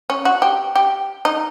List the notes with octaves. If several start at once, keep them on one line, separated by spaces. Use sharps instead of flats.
C#4
F#4
G4
G4
D#4